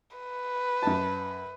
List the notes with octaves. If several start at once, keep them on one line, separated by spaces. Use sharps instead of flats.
B4
F#2 A5